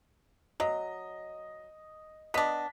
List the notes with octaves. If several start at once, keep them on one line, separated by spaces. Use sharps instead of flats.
F#3 D#5
B3 D4 D#5 B6